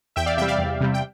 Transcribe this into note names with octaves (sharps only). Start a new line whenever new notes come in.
E2 E5 G5
D5 F5
C3 G3 E5 G5
D5 F5
E2
C3 G3
G5